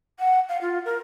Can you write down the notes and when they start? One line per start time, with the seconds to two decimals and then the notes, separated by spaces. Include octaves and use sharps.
0.19 F#5
0.49 F5
0.61 F4
0.85 A#4